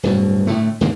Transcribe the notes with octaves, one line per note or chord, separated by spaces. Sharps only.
D1 G2 B2
A2 D3 A3
D#2 G#2 D3 A#3